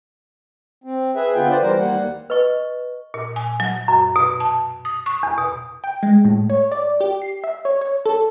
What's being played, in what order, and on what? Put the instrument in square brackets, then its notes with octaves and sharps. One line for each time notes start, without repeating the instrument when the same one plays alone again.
[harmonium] C4
G#4 B4 E5
D3 B3 F4 G5
B4 C5 D5
E3 G3 A#4 C5
D#2 G3 A#3 F#5
[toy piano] B4 D#5 C#6
[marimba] A#2
G#5
F#3
F#2
B2
A5
D#6
C#6
E2
B2
[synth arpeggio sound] G5
G#3
A2
C#5
D5
G4
C7
E5
C#5
C#5
A4